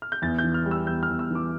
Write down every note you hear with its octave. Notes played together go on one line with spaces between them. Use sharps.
F6
G6
E2 A6
G6
E3
F6
G3
E6
E2 G6
F6
E2
E6
E3 D6